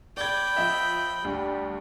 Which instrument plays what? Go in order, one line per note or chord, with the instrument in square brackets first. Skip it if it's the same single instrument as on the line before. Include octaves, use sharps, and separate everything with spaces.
[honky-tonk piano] D5 G#6 [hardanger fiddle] G5 B5
[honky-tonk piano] F3 D#5 E5
[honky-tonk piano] D2 [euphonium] G3